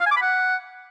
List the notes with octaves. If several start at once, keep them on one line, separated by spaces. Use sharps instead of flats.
F5
G#5
D6
B5
F#5